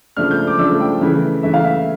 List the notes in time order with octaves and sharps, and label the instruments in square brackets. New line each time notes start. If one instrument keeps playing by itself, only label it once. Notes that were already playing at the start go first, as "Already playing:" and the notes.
[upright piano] C#3 F3 A3 D4 F6
G6
D6
C#3 F3 A3 D4 E6
G5
C#3 E3 A3 E4
C#3 E3 A3 E4 E5
F5
E5